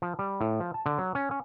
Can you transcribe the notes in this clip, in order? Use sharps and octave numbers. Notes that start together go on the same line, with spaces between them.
F3
G3
A2
F3
A5
D3
F#3
C#4
C#4